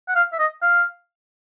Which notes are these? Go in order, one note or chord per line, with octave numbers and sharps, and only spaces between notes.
F#5
F5
E5
D#5
F5